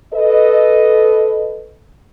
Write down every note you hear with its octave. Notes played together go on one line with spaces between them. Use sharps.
A4 B4 D#5